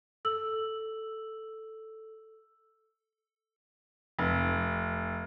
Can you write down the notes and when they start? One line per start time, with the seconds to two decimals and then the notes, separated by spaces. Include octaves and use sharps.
0.25 A4 E6 F#7
4.19 F1